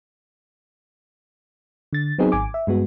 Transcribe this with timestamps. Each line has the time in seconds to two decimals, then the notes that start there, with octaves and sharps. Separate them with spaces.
1.93 D3 A6
2.18 F#3 B3 C4 D#4 G#4
2.32 G#1 G#5 D6
2.54 E5
2.67 G2 G#3 B3 F#4